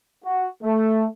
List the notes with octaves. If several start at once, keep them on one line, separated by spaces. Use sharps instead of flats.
F#4
A3